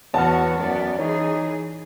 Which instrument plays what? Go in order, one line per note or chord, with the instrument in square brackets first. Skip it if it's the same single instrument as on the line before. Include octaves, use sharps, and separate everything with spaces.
[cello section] E2 F#4 [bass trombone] B3 [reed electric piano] C#5 F#5 F6 [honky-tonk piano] A5
[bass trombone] F#2 [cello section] B3 D5
[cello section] E3 G#4 [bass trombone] D#4 [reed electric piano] C#5